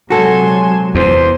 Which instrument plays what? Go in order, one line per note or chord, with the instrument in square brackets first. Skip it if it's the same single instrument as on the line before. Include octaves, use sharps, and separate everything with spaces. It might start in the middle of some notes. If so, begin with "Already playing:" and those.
[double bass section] C3 F#3 G#3 [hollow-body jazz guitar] F#4 A4 [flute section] G#5 A5 C6
[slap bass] E2 [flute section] C5 C6